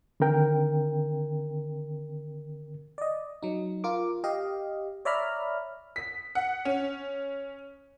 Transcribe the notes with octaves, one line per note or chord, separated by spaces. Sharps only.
D3 D#3 C4 A#4 G5
D5 D#5
F#3 D#4
F4 A#4 D6
G4 D#5 F5
C#5 D5 E5 A#5 B5 F6
B6
F#5
C#4